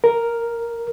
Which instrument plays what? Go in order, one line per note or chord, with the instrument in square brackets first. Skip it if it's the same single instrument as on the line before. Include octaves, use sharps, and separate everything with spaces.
[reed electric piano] A#4